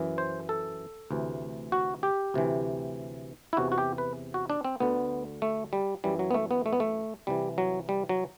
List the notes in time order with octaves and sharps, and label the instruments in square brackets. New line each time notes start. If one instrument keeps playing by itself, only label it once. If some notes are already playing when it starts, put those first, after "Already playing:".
Already playing: [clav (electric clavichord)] F#2 E3
C5
A4
D2 C3 E3
F#4
G4
D2 C3 E3
E4
E2 C3 E3 F#4
F#4
G4
B4
F#4
D4
C4
D2 D3 B3
A3
G3
F#2 E3 G3
F#3
B3
A3
B3
A3
B3
A3
C2 C3 E3 G3
F#3
G3
F#3